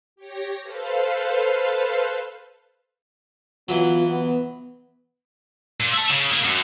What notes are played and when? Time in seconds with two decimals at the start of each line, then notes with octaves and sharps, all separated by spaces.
0.16 G4 C#5 A#6
0.62 A4 B4 C5 F5
3.69 E3 F#3 B3 F4
4.08 B3
5.80 A#2
5.93 E5 A5
6.11 C#3
6.31 A#3 E4
6.44 F#2